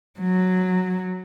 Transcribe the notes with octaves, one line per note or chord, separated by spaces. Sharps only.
F#3